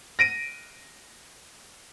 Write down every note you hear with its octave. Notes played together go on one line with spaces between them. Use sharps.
A#6 D7 D#7